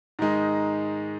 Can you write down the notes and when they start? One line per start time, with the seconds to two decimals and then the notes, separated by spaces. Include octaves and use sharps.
0.19 G#2 D#3 G#3 D#4